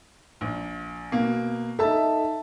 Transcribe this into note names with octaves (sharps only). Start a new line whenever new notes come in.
A#1
B2 A#3
D#4 A4 E5 A5